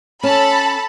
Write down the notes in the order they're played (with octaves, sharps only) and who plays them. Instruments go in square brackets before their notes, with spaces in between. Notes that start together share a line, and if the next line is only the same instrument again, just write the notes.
[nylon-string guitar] C#4 [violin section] A4 A5 B5